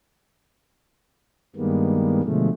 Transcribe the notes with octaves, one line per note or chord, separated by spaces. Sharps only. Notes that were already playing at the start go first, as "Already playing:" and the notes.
G2 D#3 G3 G#3 A#3 B3
B2 D3 F3 G#3 A3